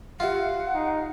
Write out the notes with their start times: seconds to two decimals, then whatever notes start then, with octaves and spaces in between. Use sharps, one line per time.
0.20 F4 G4 E5 F#5 C7
0.74 D#4